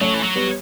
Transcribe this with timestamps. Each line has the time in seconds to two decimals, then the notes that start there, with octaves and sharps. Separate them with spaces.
0.01 F#3 A3 C#4
0.14 E3
0.23 F#3
0.35 G3 B3